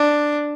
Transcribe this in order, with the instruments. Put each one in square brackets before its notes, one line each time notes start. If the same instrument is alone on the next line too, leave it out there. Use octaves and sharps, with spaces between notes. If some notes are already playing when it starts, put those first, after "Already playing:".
Already playing: [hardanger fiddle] D4